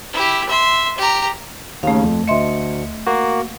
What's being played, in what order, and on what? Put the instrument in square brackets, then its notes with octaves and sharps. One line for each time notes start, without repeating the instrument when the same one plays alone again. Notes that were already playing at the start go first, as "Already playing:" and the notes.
[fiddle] E4 G4
E5 C6
G4 A#5
[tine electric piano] D#2 C#3 [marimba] A3 F5
[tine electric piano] F2
[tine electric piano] D2 C#7 [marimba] D#5 E5 C6
[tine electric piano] A#3 F#4